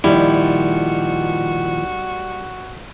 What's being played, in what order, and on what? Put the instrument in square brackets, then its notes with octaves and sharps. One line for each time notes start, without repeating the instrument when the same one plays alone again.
[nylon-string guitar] A#2 D#3 F3 [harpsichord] G3 [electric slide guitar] E4 [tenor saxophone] F#4